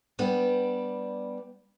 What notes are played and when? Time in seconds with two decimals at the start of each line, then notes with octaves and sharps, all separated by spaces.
0.19 G3 B3 D4